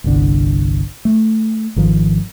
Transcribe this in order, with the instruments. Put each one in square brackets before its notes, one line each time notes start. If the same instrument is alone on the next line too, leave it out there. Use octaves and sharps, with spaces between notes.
[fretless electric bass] G1 C2 D3
A3
G#1 D#3 F3